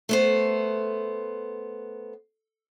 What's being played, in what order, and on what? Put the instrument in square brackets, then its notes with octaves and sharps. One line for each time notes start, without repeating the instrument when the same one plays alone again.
[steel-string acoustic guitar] A3 B3 C5